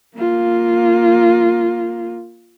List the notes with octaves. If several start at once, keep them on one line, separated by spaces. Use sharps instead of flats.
A#3 F4